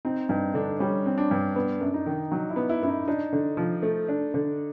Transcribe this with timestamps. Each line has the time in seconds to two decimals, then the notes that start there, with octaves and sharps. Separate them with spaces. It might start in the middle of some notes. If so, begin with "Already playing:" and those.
0.05 C4 D#4
0.29 G2 D#4
0.54 D3 D4
0.79 G3 C#4
1.06 C4
1.18 D4
1.31 G2
1.56 B3 D4
1.80 F#2
1.94 D#4
2.06 D#3
2.31 F#3 D#4
2.50 E4
2.56 B3
2.69 E4
2.82 F#2 E4
2.88 D#4
3.08 D4 D#4
3.33 D3
3.57 F3
3.82 A3
4.08 D4
4.34 D3